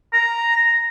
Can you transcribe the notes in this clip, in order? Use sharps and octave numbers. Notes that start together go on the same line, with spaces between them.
A#5